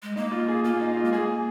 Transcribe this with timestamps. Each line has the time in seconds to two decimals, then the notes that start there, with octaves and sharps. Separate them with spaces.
0.03 G#3
0.16 A#3 D#4
0.32 F4
0.48 G#4
0.65 A#3 F4
0.81 D#4
0.97 F4
1.05 G#3
1.13 A#3 G#4